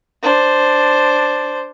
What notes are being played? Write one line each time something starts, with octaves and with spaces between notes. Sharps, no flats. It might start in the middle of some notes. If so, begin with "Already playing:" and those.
D4 C5